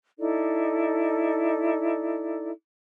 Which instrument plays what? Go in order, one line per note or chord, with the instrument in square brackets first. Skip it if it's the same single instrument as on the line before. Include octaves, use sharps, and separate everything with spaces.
[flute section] D#4 E4 A4 D5